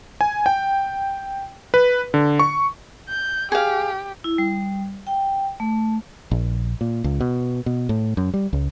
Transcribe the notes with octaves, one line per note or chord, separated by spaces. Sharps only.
G#5
G5
B4
D3
C#6
G6
G4 G#4 F5
E4
G3
G5
A3
A#1
A#2
C#2
B2
B2
A2
F#2
G3
C#2